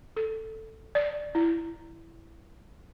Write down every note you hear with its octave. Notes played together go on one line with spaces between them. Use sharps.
A4
D5
E4